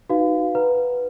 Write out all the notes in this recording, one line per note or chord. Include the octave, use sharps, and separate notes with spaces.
D#4 F#4 B4 F5
B4 F#5 A#5